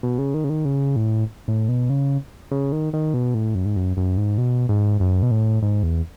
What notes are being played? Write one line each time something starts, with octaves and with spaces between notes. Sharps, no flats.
B2
C#3
D#3
C#3
D#3
C#3
A2
A2
B2
C#3
C#3
D#3
D#3
B2
A2
F#2
G#2
F#2
F#2
G#2
B2
G#2
F#2
B2
A2
G#2
E2